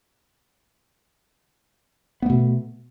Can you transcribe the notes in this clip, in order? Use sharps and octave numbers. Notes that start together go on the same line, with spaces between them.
B2 A3 B3